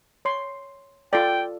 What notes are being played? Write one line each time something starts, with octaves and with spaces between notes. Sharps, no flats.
C#5 C6
F4 A4 D5 G5